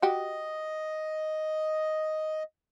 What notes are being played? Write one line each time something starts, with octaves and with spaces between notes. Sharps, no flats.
F#4 G4 D#5